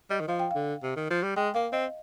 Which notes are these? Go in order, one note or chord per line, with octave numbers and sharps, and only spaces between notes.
G3 D#5
D#3
F3 F5
G5
D3 F5
C3
D#3
F3
G3
G#3 G5
A#3 F5
C4 D#5